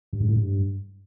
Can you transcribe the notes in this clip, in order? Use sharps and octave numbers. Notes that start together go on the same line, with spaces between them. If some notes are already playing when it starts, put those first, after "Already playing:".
G2
G#2
A2
G2